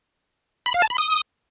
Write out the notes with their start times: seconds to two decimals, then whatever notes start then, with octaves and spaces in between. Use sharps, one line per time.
0.66 B5
0.74 F5
0.82 A5
0.90 B5
0.98 D#6